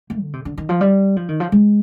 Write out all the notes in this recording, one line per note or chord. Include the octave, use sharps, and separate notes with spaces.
A#3
D3
C3
D3
D#3
F3
G3
F3
D#3
F3
G#3